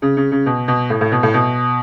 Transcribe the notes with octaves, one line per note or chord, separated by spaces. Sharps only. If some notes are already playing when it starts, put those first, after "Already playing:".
C#3
C#3
C#3
B2
B2
A2
A2
B2
A2
B2